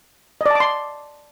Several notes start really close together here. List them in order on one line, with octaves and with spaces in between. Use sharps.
D#5 D5 A5 D6 C6